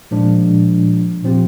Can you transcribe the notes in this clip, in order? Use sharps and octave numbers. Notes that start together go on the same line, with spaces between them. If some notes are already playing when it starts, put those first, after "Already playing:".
A#2 F3 G#3 D4
A#2 F3 C4 G4